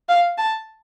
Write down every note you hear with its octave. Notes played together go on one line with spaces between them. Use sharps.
F5
A5